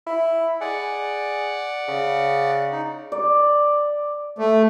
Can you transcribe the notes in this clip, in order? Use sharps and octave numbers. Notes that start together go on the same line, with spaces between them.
E4
G#4 D5 F#5
C#3
D#4
D5
A3